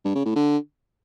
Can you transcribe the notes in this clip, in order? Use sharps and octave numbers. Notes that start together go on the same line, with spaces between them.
G2
C#3
A2
D3